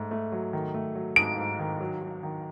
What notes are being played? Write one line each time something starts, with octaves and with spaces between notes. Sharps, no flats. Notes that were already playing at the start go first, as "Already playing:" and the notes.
Already playing: G#2 A3
A3
F#3
D#3
A3
F#3
G#2 D7
G#2
D#3
F#3
F#3
D#3